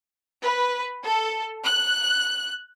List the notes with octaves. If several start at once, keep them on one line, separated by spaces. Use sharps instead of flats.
B4
A4
F#6